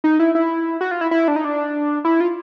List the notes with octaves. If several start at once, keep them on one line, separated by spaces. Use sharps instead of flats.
D#4
E4
E4
F#4
F4
E4
E4
D4
D#4
D4
E4
F4